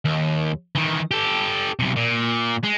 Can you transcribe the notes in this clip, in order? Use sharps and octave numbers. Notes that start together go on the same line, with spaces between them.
D#2
D#3 E3
G4 A4
B1 C3
A#2
G#3